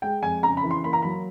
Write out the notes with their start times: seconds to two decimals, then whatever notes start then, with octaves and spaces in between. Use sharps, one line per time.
0.02 G#3 G5
0.23 F2 G#5
0.43 C#3 A#5
0.57 B5
0.63 E3
0.71 C6
0.84 A#3 B5
0.93 A#5
1.02 F#3 B5